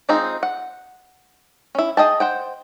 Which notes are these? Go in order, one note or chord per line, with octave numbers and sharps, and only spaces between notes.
G#3 C4 D#4 F4 G#4
F#5
C#4 E4
G#4 D#5 G5 A5
C5 F#5 G5